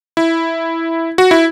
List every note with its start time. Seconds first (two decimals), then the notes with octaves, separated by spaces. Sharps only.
0.17 E4
1.18 F#4
1.31 E4